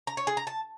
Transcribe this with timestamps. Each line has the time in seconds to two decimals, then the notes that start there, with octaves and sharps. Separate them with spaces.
0.07 A#5
0.17 C#5
0.27 G#4
0.37 A#5
0.47 A5